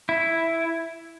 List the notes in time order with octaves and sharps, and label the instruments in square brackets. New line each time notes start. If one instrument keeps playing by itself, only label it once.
[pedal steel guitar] E4